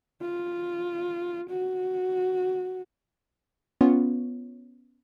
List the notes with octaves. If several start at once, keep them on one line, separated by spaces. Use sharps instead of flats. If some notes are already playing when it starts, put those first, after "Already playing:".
F4
F#4
B3 C#4 F4 C#5